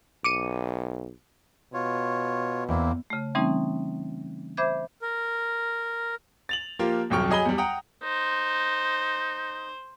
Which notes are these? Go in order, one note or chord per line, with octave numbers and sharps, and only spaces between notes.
B1 D6 C#7 D#7
B2 F4 C#5
E2 A#3 C4 E4
C#3 A3
E3 G3 A3 C4 C#4 D#4
C5 E5 B5 D6 G6 G#6
A#4
A6 F7 F#7
F3 A#3 F4 G4
D#1 C2 F#2 G5 C#6 F6
F#3 G#4 D#5 G#5 B5 G7
E2 G3
F#5 G5 A#5 D#6
D#4 C5